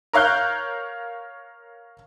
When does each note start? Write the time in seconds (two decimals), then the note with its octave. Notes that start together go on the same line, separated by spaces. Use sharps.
0.13 A#4 C#5 F5 F#6 G6